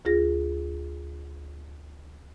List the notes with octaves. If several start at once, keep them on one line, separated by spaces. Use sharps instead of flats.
D2 F4 G#4 A#6